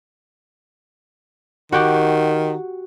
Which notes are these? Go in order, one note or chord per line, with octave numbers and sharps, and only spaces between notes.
D#3 F#4 G4